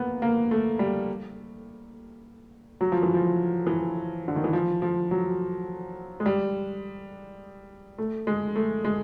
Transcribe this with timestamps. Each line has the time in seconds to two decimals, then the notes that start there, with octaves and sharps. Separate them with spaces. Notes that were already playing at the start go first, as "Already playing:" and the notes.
Already playing: A#3 B3
0.22 A#3
0.51 A3
0.79 G3
2.81 F#3
2.92 F3
3.03 E3
3.14 F3
3.67 E3
4.28 D3
4.36 D#3
4.44 E3
4.53 F3
4.82 F3
5.11 F#3
6.20 G#3
6.26 G3
7.98 A3
8.27 G#3
8.56 A3
8.85 G#3